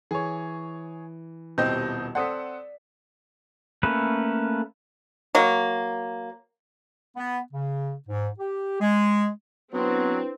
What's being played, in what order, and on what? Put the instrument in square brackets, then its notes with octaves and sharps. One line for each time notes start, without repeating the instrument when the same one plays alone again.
[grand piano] E3 [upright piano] G#4 C#5
[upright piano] D#1 C4 D#5 [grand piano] B2 E4 G4 [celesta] G6
[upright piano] C4 A4 F#5 [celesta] D5 [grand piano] C6 D#6 B6
[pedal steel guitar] A3 A#3 C#4 B4
[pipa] F#3 A#3
[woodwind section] B3
C#3
G#2
G4
G#3
[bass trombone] F#3 [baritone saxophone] B3 [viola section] C4 [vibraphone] D4 E4 B4